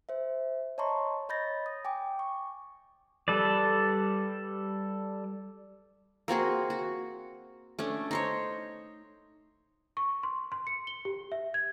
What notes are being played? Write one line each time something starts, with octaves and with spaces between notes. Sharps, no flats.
C5 E5
C#5 D#5 A5 A#5 C6 C#6
C#5 D#5 B5 G6 A6 A#6
D#6
G5 G#5 D6
C#6
G3 A4 B4 D5
A#3 C4 F#4 G#4
F#4
A3 C#4 D4
D#4 C5 C#5
C#6
C6
C6
C#7
G7
G4
E5
G#6